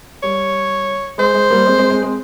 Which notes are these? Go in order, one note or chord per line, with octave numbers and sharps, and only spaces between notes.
G3 C#5
G#3 C5
G#3
G3 A#3
G#3 C4
G#3 C4
G#3 C4
G#3 C4